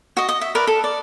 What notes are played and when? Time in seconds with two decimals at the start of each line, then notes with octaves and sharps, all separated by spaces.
0.17 F#4 D#5
0.29 D#5
0.41 E5
0.55 A#4 B4 D5
0.67 A4
0.84 D5